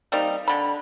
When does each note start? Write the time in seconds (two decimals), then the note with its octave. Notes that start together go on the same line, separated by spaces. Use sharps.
0.12 G3 A#3 C4 D#4
0.48 D3 B5